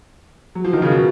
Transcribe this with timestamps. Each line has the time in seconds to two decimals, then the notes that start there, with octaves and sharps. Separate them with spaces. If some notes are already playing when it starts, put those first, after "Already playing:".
0.55 F#3
0.64 F3
0.73 D#3
0.82 C#3
0.91 B2